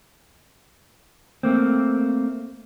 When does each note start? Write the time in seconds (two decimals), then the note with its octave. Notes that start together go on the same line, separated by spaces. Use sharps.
1.43 A3 A#3 C4